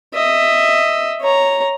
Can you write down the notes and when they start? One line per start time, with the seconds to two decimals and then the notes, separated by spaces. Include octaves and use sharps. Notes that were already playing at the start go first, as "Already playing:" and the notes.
0.14 D#5 E5
1.21 C#5 A#5